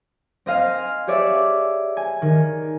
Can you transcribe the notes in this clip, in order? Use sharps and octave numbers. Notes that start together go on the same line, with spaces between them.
C4 D#5 F5 G#5 D#7
G4 G#4 C#5 D5 E5
G#5
D#3